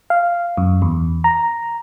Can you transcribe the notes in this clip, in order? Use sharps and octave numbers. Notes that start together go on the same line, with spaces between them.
F5
F#2
E2
A#5